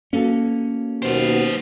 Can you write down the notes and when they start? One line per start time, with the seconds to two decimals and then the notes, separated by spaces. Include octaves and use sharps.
0.13 A#3 C#4 F#4 A4
1.03 D#2 B2 F#3 B3 C5